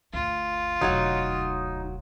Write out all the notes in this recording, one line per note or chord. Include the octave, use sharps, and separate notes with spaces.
G1 D2 F4
E1 D2 F#3 D#4 C#5 F#5